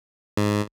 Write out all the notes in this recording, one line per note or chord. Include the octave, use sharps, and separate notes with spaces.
G#2